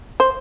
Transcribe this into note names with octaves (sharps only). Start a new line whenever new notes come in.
C5